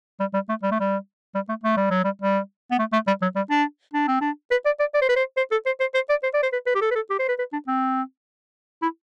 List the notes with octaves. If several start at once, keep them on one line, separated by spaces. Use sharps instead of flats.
G3
G3
A3
G3
A3
G3
G3
A3
A3
G3
F#3
G3
G3
B3
A3
A3
G3
F#3
G3
D4
D4
C4
D4
B4
D5
D5
D5
C5
B4
C5
C5
A4
C5
C5
C5
D5
C5
D5
C5
B4
B4
G4
A4
B4
A4
G4
C5
B4
B4
D4
C4
E4